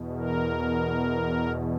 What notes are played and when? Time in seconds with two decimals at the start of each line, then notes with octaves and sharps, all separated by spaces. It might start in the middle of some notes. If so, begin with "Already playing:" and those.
Already playing: E2 B2
0.17 A#4